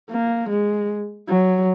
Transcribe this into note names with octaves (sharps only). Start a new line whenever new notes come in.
A#3
G#3
F#3